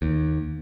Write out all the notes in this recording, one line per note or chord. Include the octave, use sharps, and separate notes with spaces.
D#2